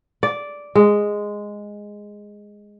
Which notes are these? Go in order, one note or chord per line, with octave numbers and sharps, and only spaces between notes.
D5
G#3